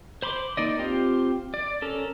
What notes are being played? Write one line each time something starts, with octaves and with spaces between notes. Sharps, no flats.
C5 B5 C6 D6
A#3 D#4 D5 D#5
C4 F4 G4 C5
D5
C#4 A4 A#4